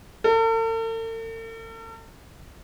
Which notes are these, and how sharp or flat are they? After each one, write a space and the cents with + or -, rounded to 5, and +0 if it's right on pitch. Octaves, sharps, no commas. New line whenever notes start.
A4 +45